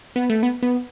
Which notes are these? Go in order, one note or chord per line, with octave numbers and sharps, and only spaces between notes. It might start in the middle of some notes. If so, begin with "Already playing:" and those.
B3
A3
B3
B3